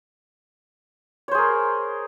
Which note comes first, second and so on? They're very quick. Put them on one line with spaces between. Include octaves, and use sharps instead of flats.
C#5 C5 G#4 A#4